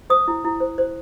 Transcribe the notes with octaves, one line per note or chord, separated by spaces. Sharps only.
C5 D#6
E4
E4
C5
C5